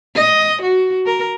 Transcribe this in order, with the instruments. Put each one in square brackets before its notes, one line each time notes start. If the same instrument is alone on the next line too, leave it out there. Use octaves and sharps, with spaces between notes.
[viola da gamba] D#5
F#4
A#4